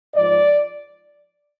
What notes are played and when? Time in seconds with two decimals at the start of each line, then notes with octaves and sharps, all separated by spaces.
0.15 G#2 F3 D5